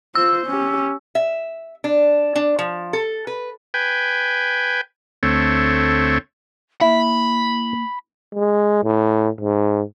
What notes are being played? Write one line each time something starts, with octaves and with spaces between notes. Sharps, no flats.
F4 C5 E6
C#4 G4
E5
D4
D4
F3
A4
B4
B4 G5 G#5
D2 A3 C4 C#5
A#3 E4 B5
G#3
A2
G#2